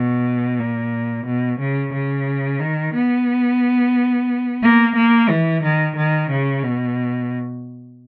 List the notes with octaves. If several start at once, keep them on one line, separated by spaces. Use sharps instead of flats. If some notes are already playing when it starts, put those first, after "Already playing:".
Already playing: B2
A#2
B2
C#3
C#3
D#3
B3
A#3
A#3
E3
D#3
D#3
C#3
B2